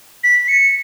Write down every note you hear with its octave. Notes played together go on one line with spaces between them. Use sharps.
B6
C#7